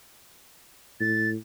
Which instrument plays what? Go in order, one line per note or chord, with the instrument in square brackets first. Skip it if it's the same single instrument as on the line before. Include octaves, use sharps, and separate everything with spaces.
[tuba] A2 [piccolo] A6